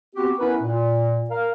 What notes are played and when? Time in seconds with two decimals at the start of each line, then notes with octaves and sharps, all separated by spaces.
0.15 B3 C4 F#4 G4
0.39 B3 C#4 E4 A#4 B4
0.62 A#2
1.30 A#4 F5